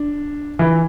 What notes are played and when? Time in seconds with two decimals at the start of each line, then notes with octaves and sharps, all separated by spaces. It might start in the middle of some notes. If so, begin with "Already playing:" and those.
Already playing: D4
0.59 E3